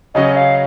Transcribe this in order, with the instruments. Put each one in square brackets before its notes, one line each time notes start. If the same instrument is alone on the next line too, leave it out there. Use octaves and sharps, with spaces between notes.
[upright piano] C#3 F#3 C#4 F#4 [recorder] D#5
[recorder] F5